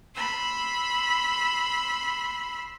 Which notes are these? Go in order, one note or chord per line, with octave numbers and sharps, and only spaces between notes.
B5 C6 E6